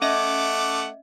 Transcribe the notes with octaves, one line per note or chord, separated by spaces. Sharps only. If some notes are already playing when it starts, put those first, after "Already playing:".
A3 C#4 D#5 E5 F#5 D6